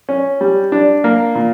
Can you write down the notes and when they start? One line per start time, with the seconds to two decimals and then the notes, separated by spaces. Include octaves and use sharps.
0.09 C#4
0.41 G3
0.72 D4
1.04 A#3
1.35 A#2